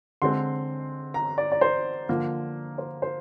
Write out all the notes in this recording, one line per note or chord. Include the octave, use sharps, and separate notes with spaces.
D3 G#3 C4 C6
A#5
D5
D5
C5
D3 F3 A#3
C5
C5